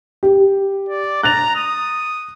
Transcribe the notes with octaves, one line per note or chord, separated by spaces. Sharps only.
G4
D5
A#5 F#6 A6 F7
D#6